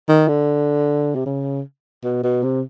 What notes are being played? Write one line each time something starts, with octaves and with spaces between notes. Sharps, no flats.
D#3
D3
C3
C#3
B2
B2
C3